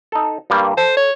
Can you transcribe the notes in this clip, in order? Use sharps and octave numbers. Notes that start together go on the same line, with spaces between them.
D#4 A4
G2 G3 A#3
A4 C5
C#5